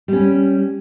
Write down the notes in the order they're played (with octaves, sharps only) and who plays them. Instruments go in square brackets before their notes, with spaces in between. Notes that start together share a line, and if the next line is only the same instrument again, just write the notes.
[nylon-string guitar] G3 C#4